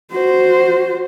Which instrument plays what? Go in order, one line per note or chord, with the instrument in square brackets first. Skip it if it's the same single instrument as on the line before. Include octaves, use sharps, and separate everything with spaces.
[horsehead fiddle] F#4 C5